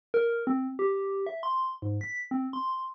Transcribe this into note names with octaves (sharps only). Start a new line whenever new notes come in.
A#4
C4
G4
E5
C6
G#2
B6
C4
C6